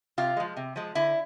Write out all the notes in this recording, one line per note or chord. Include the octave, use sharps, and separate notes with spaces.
C3 F4
F3 G#3
C3
F3 G#3
D3 E4